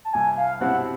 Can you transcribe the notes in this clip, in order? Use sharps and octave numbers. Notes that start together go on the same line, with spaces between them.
A5
C2 G#5
F5
B2 G3 C4 E4 F#5